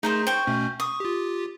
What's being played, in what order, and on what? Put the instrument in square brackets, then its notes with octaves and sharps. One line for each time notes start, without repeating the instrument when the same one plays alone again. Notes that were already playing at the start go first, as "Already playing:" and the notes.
[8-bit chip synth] A3 G#4 [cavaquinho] D#4 A#4 C5
[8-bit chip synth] C5 C6 [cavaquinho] G5 C#6
[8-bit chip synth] B2 A3 C#4
[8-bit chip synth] C#6 [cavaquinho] D#6
[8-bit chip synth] F4 G4